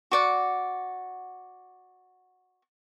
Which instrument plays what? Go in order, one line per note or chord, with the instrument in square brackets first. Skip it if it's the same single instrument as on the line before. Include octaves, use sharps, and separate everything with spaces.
[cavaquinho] F#4 D5 F#5